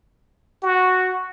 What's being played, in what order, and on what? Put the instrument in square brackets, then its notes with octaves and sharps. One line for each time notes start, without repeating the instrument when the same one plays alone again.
[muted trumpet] F#4